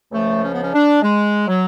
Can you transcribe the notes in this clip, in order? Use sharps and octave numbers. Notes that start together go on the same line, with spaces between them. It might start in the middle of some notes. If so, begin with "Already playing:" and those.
C#2 C#3 F3 A3
C#4
B3
C#4
D4
G#3
F#3